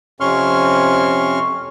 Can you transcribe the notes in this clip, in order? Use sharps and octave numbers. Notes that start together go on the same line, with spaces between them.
F2 C3 C#4 C6 C#6 F6